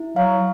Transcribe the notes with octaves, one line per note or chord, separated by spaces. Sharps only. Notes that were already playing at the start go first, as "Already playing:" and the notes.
Already playing: E4
F#3 F5